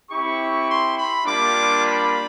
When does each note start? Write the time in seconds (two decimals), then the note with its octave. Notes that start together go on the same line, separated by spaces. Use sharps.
0.10 C4 E4 G4 C#6
0.68 C6
0.97 B5
1.26 G3 A#3 D4 F4 D6
1.84 B5